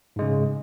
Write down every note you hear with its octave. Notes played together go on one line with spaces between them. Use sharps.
G#2 C#3 G#3